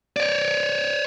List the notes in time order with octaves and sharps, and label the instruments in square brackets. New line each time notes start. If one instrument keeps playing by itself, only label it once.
[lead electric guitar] C#5 D5